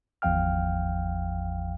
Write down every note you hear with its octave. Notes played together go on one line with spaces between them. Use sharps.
G#1 E2 F3 F5 G5 F6